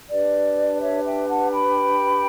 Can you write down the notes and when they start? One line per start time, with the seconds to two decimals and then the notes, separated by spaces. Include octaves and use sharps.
0.10 D4 G4 B4 D5
0.81 C#5 E5
1.04 E5 G5
1.27 F#5 A5
1.51 G5 B5